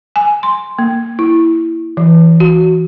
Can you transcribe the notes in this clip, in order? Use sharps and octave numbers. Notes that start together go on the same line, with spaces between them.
G#5
C6
A#3
E4
E3
F#4